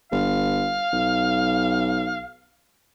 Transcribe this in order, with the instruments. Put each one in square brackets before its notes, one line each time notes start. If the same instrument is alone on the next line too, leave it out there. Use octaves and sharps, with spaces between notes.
[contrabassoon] G1 [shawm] F5
[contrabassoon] B1